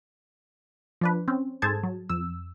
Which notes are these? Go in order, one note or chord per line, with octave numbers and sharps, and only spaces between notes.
F3 D4 B4
C4 C#4
G#2 G#4 A4 C5 A5 G#6
F#3
F2 E6